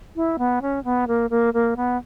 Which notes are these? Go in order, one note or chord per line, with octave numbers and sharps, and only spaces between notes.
E4
B3
C#4
B3
A#3
A#3
A#3
B3